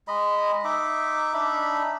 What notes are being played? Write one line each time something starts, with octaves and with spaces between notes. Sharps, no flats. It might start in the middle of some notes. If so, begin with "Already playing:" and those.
G#3 D#5 B5
D#4 E5 D6
D4 D#4 E5 B5